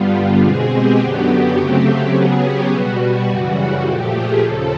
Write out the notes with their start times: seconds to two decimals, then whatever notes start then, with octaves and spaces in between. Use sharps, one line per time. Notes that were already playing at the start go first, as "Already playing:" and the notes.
Already playing: G2 D3 G3 B3 F4
0.42 B2 G#3 C4 G#4
0.71 G4
1.00 F#2 D3 F#3 B3
1.57 C#3 F#3 A3 C4
2.14 C#3 F#3 B3 G#4
2.43 G4
2.71 B2 G3 B3 F#4
3.28 F#2 C#3 E3 G3
3.86 A#2 F3 A3 G4
4.14 G#4
4.43 D#2 C#3 F3 A4